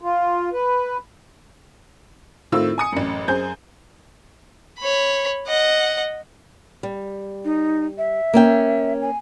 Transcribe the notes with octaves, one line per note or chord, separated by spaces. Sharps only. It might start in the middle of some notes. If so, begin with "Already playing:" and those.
F4
B4
A2 D#3 C4 F4 E6
G#5 D#6 C#7
A1 F#2
F#2 G#4 C5 G6
C#5 B5
D#5 F#5
G3
D#4
E5
A#3 C#4 G5
G#5